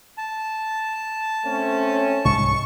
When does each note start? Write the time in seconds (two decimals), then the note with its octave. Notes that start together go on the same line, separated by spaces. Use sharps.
0.18 A5
1.45 A3 C4 C#4
2.25 C2 G#2 G#3 C#6